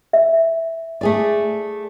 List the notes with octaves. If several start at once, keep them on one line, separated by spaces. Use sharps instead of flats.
E5
A3 G#4 D5